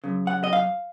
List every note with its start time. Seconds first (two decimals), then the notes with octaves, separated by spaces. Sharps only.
0.04 F#2 C#3
0.27 F#5
0.44 D#5
0.53 F5